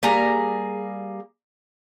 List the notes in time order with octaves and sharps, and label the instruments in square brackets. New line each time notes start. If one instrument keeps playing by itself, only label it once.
[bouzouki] G3 A#3 G#4 A#5